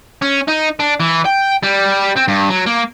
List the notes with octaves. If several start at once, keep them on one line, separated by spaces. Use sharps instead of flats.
C#4
D#4
D4
E3
G5
G3
C4
G2
F#3
A#3